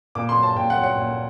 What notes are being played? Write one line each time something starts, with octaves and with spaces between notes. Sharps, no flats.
A#2 D6
C6
F#3
A5
A#2 G5
F#5
F#3
F#5
A#2